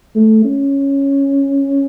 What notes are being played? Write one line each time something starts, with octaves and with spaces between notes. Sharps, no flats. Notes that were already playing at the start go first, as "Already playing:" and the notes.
A3
C#4